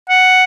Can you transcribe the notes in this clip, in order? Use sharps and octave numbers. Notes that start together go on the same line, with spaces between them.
F#5